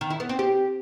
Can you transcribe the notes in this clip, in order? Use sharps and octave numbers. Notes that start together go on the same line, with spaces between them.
D#3
E4
B3
C4
G4